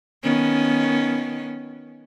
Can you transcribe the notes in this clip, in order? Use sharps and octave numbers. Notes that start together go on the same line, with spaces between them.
D#3 B3 C#4